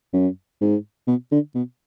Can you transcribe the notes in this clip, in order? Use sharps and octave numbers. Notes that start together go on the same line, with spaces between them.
F#2
G#2
B2
D3
B2